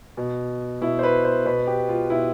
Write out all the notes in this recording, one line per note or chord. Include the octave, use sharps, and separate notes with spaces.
B2
B2 E4
C5
B4
C5
B2 B4
G4
F4
B2 E4